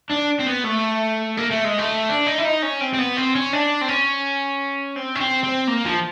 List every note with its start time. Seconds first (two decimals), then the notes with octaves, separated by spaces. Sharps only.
0.11 D4
0.40 C4
0.47 B3
0.65 A3
1.37 A#3
1.51 A3
1.64 G#3
1.78 A3
2.09 D4
2.26 D#4
2.38 E4
2.45 D#4
2.62 C#4
2.80 C4
2.94 C4
2.98 B3
3.17 C4
3.35 C#4
3.53 D4
3.81 C4
3.88 C#4
4.96 C4
5.15 C#4
5.20 C4
5.43 C4
5.67 A#3
5.85 F3